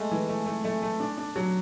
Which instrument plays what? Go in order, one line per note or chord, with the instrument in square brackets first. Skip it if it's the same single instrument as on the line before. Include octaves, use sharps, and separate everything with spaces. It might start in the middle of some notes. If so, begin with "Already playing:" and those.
Already playing: [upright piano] G#3 A3
E3
A3
A3
A3
A3
D4
D4
F#3